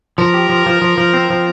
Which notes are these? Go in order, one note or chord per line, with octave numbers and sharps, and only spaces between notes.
F3 A#4
G4
F3
F3
F3
F3
C4
F3